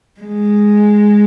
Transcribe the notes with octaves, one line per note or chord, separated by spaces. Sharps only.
G#3